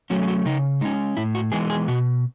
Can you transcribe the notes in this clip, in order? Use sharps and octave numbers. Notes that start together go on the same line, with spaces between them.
F#3 A3 C#4 F#4
G#4
F#4
C#3 D#4
G#3 C#4 D#4
A2 E4
F#4
E3 G#3 B3 D#4 G#4
G#4
B2 F#4